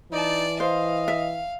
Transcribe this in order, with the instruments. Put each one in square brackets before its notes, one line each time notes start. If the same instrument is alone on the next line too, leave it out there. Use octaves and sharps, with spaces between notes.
[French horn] E3 [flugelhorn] D#4 [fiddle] D5 A5
[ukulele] C5 [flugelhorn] D#5 [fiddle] F5
[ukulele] E5